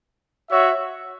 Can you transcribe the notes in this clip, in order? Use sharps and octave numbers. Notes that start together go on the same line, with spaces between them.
F#4 C#5 E5